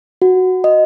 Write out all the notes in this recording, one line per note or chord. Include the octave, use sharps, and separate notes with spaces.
F#4
D#5